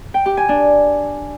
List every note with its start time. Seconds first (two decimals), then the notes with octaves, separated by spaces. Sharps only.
0.14 G5
0.26 G4
0.37 G#5
0.49 D4